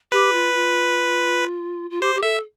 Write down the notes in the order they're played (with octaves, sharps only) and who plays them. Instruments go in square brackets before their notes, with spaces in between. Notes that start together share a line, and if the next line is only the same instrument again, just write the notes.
[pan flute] G4 [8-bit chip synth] B4
[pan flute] F4
F4
F4
[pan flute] G4 [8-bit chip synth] C5
[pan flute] G4
[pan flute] A4 [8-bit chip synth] E5